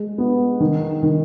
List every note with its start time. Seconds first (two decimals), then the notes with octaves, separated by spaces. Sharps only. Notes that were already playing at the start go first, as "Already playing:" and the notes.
Already playing: G#3
0.18 B3
0.60 D#3
1.03 D#3